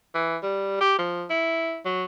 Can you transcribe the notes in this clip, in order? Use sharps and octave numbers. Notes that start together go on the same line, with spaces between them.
E3
G3
G4
F3
E4
F#3